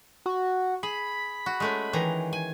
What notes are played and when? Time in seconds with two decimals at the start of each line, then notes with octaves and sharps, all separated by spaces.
0.26 F#4
0.83 G#4 B5
1.46 F#4
1.60 G#3 A3 C#4
1.93 D#3 E3 A#5
2.33 G#5